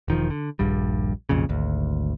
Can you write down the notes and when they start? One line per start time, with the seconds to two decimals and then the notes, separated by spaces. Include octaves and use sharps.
0.08 E1 D#3 F3
0.30 D3
0.59 D#1 A#1 G2 G3
1.29 B1 F2 A#2 C#3
1.49 G#1 D2